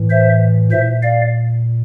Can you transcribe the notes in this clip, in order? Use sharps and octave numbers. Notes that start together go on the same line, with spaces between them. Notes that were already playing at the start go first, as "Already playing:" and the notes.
Already playing: A2 E3
C5 E5
A#2 C5 E5
D5 F5